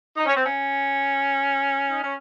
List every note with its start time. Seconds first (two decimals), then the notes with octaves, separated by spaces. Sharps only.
0.17 D#4
0.26 C#4
0.35 C4
0.44 C#4
1.90 D#4
2.02 C#4